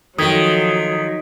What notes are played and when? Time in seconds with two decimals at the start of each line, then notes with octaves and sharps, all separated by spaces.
0.18 D#3 F3 F#3 A4 G5 D#6 G#6 B6